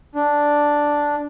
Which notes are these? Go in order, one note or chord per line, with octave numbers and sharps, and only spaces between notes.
D4